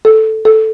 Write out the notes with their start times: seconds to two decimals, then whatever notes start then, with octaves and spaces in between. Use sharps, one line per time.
0.05 A4
0.45 A4